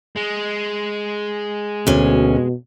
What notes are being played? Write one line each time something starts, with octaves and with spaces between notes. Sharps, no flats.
G#3
D2 B2 C#4